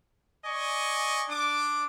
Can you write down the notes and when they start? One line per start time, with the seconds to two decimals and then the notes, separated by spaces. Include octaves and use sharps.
0.44 D5 D#5 G#5 C#6
1.29 D4 D6